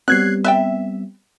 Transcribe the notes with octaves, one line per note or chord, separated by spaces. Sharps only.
F#3 G3 B3 C4 F#6 G#6 C7
B4 D5 E5 G5